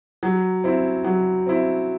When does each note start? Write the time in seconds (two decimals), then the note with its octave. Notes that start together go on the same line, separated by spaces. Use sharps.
0.23 F#3
0.64 C4 E4
1.05 F#3
1.46 C4 E4